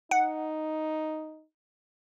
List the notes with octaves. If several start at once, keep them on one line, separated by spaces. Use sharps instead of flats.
D#4 F#5